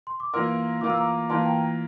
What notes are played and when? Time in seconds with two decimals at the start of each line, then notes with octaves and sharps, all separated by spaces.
0.07 C6
0.20 D6
0.34 E3 A#3 F4 A#4 C6 E6
0.81 E3 A#3 F4 A#4 D6
0.90 E6
0.97 A#5 D6
1.30 E3 A#3 F4 A#4 A5 C6
1.46 G5 A#5